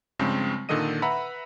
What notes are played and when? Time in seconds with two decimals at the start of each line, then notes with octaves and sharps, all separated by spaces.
0.19 G2 C#3 F3 G#3 C4
0.69 A#2 D3 D#3 A4 D#5 D#7
1.02 B4 E5 F#5 A#5 B5